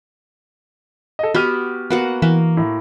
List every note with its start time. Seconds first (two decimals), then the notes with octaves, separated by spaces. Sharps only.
1.19 A4 D#5
1.34 B3 F#4 G4 B5 F6 D#7
1.90 A#3 B3 F#4 F#5
2.22 E3 A#3
2.57 A2